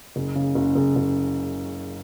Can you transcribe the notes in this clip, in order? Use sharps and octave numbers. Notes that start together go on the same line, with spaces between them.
F#1
C#3
F#1
F#1
F#1